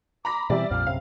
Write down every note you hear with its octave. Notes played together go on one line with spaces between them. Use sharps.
A#5 B5 D6 A#6
B2 E3 G3 C4 D5 E5
A#1 F2 A#2 F6
A#1 F#2 C3 F5